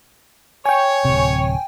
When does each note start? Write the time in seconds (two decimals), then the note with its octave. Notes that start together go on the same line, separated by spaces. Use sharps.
0.66 C#5 G5 G#5
1.05 D1 C3